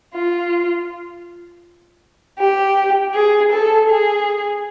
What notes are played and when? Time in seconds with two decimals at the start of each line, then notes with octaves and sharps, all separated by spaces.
0.15 F4
2.39 G4
3.15 G#4
3.52 A4
3.89 G#4